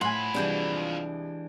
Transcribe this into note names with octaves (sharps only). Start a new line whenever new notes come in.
A2 F3 F#5 G#5 B5 C6
C2 E3 G#3 D4 G6